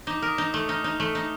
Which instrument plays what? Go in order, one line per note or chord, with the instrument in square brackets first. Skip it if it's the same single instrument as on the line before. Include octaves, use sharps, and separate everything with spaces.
[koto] D#4 [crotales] D6
[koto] A#4
[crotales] D#6
[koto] D#4
[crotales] D#6
[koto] A3
[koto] D#4 [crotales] F6
[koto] D#4
A3
D#4